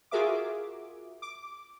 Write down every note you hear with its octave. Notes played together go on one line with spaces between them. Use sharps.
F4 F#4 G#4 A#4 E5 D6
D6